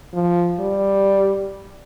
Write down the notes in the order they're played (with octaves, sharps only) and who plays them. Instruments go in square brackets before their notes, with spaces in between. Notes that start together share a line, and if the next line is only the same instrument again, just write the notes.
[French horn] F3
G3